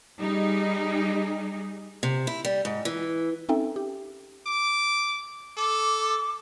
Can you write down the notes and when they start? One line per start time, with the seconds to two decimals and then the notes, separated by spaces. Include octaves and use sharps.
0.20 G3 D#4 G#4
2.03 C3
2.27 E4
2.45 G3
2.65 G#2
2.85 E3
3.49 C4 C#4 D#4 A4 E5 G5
3.76 G4
4.47 D6
5.57 A4 D6